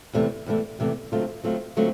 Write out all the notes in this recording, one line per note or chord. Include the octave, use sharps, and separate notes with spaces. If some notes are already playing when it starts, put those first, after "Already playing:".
E2 C3 E3 A3
E2 C3 E3 A3
E2 C3 E3 A3
D3 F#3 A3 C4 F4
D3 F#3 A3 C4 F4
D3 F#3 A3 C4 F4